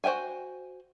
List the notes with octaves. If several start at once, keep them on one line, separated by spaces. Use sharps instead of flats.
F#4 C5 E5 G5 G#5